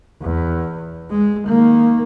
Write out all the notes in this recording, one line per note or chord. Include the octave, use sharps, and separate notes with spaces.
E2
G#3
D#3 A#3